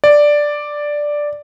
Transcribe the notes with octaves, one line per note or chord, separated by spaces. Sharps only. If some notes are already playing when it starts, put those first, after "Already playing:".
D5